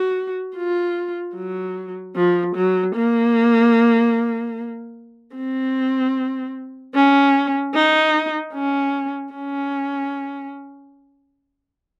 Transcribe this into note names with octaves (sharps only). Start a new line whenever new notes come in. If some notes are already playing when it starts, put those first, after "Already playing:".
Already playing: F#4
F4
F#3
F3
F#3
A#3
C4
C#4
D#4
C#4
C#4